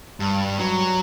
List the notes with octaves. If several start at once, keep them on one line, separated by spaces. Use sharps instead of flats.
G2
F#3